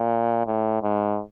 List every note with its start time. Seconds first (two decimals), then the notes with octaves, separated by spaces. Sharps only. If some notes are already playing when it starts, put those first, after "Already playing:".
Already playing: A#2
0.46 A2
0.83 G#2